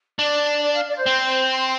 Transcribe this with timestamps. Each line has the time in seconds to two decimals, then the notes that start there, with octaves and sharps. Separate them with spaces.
0.19 D4 D5
0.62 D5
0.73 F5
0.88 D5
0.95 C5
1.06 C4
1.49 C6